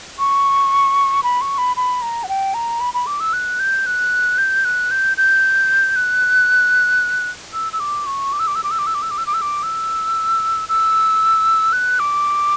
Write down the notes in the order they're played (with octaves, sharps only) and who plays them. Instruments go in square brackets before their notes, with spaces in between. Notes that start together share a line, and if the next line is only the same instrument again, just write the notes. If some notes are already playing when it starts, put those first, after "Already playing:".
[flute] C#6
B5
C#6
B5
B5
A#5
F#5
G5
A#5
B5
B5
D6
E6
F#6
G6
F#6
G6
F#6
G6
G6
F#6
E6
E6
D6
C#6
D6
E6
D6
E6
D6
E6
D6
E6
D6
E6
D6
E6
D6
E6
D6
E6
E6
F#6
D6